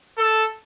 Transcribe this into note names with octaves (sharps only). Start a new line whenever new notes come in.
A4